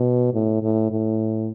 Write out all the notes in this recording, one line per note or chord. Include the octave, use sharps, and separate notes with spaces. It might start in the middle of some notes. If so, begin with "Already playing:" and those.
Already playing: B2
A2
A2
A2